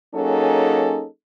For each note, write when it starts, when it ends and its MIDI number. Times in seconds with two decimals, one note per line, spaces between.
0.15 1.06 54
0.15 1.06 58
0.15 1.06 61
0.15 1.06 63
0.15 1.06 68
0.15 1.06 69